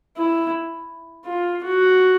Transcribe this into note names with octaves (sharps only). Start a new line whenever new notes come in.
E4
F4
F#4